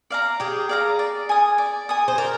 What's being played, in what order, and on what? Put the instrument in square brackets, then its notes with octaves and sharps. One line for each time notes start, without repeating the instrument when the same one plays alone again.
[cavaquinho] D5 F5 A#5
[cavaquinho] G4 [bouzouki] G#4
[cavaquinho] D5 F5 A#5
D5
G#5 D#6
D5
G#5 D#6
[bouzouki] C5
[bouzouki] A#4 [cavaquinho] D5